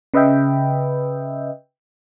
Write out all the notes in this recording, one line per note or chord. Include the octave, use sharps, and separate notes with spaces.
C#3 B4 D#5 E5 G5